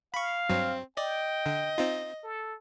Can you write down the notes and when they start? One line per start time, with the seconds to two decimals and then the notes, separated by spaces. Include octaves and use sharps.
0.14 F5 B5 C#6
0.49 G2 F#3 C4
0.97 D5 D#5 G5
1.46 D3
1.78 C4 D#4 F4
2.23 A4